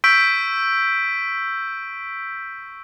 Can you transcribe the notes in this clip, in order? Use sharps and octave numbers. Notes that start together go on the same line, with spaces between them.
C#6 E6 G6 B6 D7